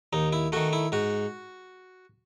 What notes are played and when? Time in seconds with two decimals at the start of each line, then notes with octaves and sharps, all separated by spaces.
0.13 D#2 D#4
0.33 E4
0.52 D#3 A3 F#4
0.73 E4
0.92 G#2 F#4